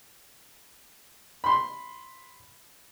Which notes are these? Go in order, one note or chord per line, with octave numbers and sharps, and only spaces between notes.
B5 C6